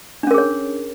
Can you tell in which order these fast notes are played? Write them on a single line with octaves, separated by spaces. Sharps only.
D4 C#4 A#4 G#4 C#5